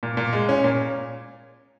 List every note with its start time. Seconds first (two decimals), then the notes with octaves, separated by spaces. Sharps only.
0.03 A#2
0.17 A#2
0.33 G#3
0.49 C#4
0.64 A#2